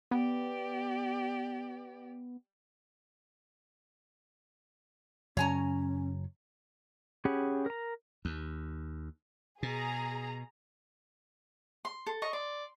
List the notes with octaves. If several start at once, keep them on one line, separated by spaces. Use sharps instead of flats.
B3 G4 D5
F#2 C#3 F#3 C#4 C#5 G#5 A#5
C#4 G4 G#4 F#5 B5
A#4 A#5
D#2
B2 G#4 A#5
C6
A4
D#5 A#5 C#6
D5 C6